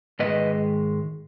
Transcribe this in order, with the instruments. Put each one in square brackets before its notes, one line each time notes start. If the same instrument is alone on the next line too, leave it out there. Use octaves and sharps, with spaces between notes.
[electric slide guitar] G#2 D#3 G#3 B4 D#5